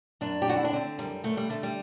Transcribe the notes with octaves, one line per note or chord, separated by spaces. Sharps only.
F#2 D4
G4
D3 F#4
E4
D4
D3 C4
F#2 G3
D3 A3
G3
D3 A3
G3